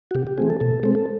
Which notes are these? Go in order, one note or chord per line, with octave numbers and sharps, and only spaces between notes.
F#4
C3 G4
G4
E3 A3 C4 G#4
A4
B2 A4
G#3 C4 A4
A4